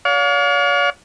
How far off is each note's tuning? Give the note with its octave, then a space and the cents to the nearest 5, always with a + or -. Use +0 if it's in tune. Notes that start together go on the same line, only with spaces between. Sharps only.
C#5 +45 F5 +35